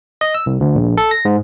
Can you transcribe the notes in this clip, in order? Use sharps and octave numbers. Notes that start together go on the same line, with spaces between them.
D#5
E6
C2
D2
A#1
A4
A#6
G#2